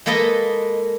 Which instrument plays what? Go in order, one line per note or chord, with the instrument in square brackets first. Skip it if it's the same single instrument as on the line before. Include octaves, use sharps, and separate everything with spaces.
[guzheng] G#3 A#3 A4 B4 D#5